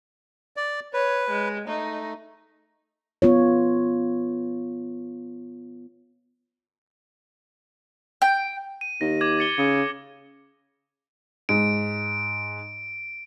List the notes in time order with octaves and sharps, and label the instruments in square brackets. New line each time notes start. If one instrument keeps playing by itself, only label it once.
[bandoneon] D5
[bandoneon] B4 [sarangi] C#5
[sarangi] G#3
[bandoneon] A3 [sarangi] D#4
[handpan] B3 F4 C#5
[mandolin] G5
[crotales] D#7
[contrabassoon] D#2 [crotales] A#6
[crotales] D6 G#6 F#7
A6 C#7 G7
[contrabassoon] C#3 [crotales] C#7 D#7
[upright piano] G#2 [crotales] D7